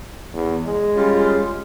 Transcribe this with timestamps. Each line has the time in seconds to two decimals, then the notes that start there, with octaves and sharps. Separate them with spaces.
0.34 E2
0.65 G#3
0.96 G3 C#4 F4